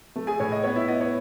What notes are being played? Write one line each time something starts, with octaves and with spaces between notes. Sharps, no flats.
A3
G#4 G#5
A2 C#5
D#5
B3 C#5
E4 E5
B3 D#5
C#5